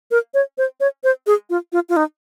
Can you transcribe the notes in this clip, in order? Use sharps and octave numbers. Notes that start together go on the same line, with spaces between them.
A#4
C#5
C5
C#5
C5
G#4
F4
F4
F4
D#4